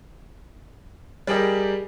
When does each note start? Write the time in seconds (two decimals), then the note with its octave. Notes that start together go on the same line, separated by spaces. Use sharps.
1.27 G3 G4 G#4 A#4 D#5